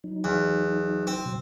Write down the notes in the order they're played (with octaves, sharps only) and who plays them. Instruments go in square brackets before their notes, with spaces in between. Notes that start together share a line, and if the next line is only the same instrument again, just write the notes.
[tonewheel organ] F#3 D#4
[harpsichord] E2
C4
[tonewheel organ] B2 F#3